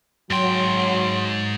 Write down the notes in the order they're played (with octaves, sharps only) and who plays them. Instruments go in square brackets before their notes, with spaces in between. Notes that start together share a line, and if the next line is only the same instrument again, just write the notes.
[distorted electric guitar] G#2 G5 [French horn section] F#3 [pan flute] C6